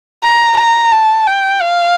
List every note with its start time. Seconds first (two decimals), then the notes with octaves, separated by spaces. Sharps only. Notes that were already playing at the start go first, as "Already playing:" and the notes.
0.23 A#5
0.58 A#5
0.92 A5
1.27 G5
1.61 F5